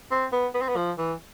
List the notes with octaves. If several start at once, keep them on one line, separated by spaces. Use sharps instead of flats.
C4
B3
B3
C4
B3
F3
E3